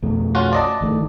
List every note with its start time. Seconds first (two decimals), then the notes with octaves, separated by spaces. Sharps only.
0.02 B1 F2 A3
0.35 C#4 F4 F#4
0.53 D5 D#5 A5
0.81 G1 D#3 A3